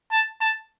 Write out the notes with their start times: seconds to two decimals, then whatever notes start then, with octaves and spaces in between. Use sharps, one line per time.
0.12 A5
0.41 A5